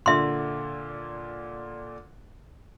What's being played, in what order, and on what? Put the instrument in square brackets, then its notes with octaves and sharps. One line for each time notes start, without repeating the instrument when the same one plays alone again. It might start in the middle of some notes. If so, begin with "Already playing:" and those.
[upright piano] A#2 D3 [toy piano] E5 C6